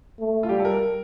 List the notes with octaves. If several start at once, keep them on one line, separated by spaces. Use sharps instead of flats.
A3
F4
G3 G4
A4
A#4